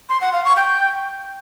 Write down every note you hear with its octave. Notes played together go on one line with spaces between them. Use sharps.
C6
F#5
F5
C#6
G5